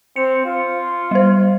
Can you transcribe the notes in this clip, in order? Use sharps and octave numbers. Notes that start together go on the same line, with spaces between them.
C4 C#7
F4
G3 C5